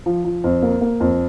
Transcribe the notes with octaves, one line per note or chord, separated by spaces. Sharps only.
F3
F3
F2
A#3
A#3
F2